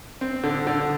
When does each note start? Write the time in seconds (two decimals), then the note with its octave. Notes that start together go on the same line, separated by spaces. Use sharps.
0.21 C4
0.43 D3
0.67 D3